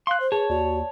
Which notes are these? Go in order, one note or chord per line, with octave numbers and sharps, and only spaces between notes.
F5 C6 F#6
C5
G#4 B4 C#5 A5
D#2 F#4 D5